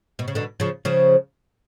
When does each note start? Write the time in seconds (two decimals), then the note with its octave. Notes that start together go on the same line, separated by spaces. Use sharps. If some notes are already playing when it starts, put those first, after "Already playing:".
0.19 B2
0.28 C#3
0.35 B2 D3
0.60 C#3 F3
0.85 C#3 F3